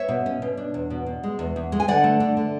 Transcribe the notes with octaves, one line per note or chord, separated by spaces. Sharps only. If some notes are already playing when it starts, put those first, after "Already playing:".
Already playing: C#5 E5
B2
C#4
B2
D4
E2
B2
B2
G#3
E2
E2
G#3
G#5
D3 D5 F#5
A3
D3
D3